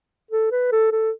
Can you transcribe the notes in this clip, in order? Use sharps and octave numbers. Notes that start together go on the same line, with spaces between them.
A4
B4
A4
A4